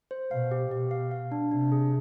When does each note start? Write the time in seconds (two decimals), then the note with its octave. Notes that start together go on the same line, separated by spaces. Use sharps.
0.11 C5
0.31 B2 F5
0.51 G4
0.71 B2 G4
0.91 F5
1.11 F5
1.32 D4
1.51 C3 D4
1.72 G#4